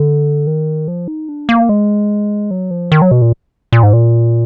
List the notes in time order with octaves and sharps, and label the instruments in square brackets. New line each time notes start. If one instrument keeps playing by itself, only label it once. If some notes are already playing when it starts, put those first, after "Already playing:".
Already playing: [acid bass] D3
D#3
F3
D#4
D4
A#3
G#3
F#3
F3
D#3
F#3
B2
A#2
A#2
G#2
A#2